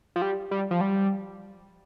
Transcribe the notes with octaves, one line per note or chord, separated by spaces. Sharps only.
F3
G3
G3
F3
G3